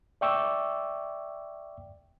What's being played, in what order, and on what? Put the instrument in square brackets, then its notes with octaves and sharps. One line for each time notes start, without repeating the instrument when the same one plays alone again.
[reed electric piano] D5 E5 G5 C#6 D6 E6